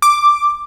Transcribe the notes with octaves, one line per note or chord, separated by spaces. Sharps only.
D6